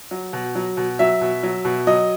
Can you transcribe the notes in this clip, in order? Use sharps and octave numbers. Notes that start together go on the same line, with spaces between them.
F#3
B2
F#3
B2
F#3 E5
B2
F#3
B2
F#3 D#5